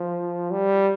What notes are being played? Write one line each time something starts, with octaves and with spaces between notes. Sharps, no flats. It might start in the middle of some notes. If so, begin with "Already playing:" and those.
Already playing: F3
G3